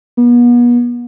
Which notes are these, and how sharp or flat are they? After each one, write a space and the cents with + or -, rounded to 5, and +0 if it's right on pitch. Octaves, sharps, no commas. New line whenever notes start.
B3 -40